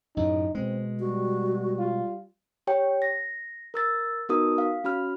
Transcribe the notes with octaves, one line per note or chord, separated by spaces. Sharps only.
F#2 A2 C#3 D#4
B2 G#3 C4
G3 F#4
F4
G4 C#5 G5
A#6
A#4 E6 A6
B3 D#4 F#4 A#4 D#6
F5
C#4 F#4 B5 F6